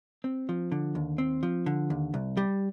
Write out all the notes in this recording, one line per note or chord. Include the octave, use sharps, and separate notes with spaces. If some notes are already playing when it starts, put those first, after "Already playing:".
C4
F3
D3
D#2
C4
F3
D3
D#2
C2
G3